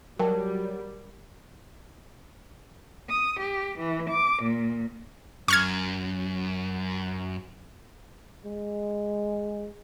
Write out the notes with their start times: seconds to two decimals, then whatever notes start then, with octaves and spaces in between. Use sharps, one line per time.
0.19 F#3 G3 A#4 G5 A5
3.08 D#6
3.39 G4
3.78 E3
4.09 D6
4.43 A#2
5.48 F#2 C#6 F6 G#6
8.45 G#3